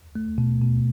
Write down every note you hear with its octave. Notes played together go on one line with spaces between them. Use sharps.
A3
B2
B2